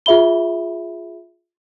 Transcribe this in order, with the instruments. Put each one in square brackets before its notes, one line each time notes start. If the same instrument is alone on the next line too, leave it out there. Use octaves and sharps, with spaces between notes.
[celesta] F4 G#4 E5 B5 G7